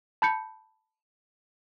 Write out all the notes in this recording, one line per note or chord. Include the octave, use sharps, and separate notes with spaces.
A5 B5 G6 C#7